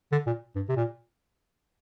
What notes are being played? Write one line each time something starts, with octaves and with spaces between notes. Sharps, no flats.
D3
A#2
G2
C3
A#2